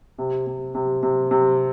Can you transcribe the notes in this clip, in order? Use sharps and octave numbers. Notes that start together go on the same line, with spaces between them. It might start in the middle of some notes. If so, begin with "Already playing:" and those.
C3
C3
C3
C3
C3